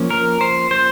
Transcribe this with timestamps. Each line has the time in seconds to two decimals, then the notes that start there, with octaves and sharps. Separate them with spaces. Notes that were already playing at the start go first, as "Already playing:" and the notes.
Already playing: F3 A#3 C#4
0.10 A#4
0.41 C5
0.71 C5